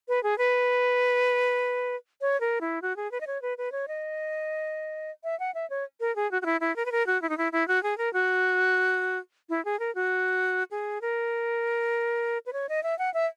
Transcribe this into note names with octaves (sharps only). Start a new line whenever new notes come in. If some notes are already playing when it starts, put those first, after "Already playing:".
B4
G#4
B4
C#5
A#4
E4
F#4
G#4
B4
D#5
C#5
B4
B4
C#5
D#5
E5
F#5
E5
C#5
A#4
G#4
F#4
F#4
E4
E4
A#4
B4
A#4
F#4
E4
D#4
E4
E4
F#4
G#4
A#4
F#4
E4
G#4
A#4
F#4
G#4
A#4
B4
C#5
D#5
E5
F#5
E5